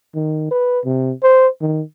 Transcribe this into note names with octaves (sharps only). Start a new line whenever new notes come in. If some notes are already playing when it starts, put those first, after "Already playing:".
D#3
B4
C3
C5
D#3